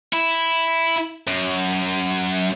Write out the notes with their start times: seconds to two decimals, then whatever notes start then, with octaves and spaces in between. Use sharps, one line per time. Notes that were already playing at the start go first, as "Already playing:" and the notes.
0.13 E4
1.28 F#2